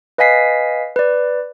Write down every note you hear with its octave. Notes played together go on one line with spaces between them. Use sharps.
B4 D#5 F5 G#5 B6 C7
B4 D5